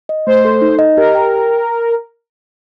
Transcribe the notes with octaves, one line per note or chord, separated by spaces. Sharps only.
D#5
A3 C5
A4
D#4
D#5
G4 A#4
G5